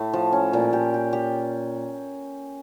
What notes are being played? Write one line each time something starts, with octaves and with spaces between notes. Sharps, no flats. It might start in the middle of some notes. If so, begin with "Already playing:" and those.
Already playing: A2 A3
F3
C#4
A#2
G4
G4
G4